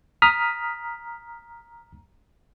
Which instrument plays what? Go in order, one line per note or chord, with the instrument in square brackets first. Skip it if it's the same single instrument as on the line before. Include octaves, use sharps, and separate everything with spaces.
[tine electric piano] A#5 D#6 F6 B6